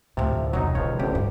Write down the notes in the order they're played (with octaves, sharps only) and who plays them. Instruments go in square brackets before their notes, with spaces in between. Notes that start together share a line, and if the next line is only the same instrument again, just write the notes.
[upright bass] D2 A2 [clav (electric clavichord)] C3 F3
[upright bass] E1 C2 [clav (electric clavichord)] F#3 D#4
[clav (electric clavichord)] C#2 F3 C#5 [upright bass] D3
[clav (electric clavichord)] A1 D2 G4 [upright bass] C#4
[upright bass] G2